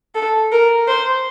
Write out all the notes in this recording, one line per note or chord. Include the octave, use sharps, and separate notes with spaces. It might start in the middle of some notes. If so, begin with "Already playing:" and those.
A4
A#4
C5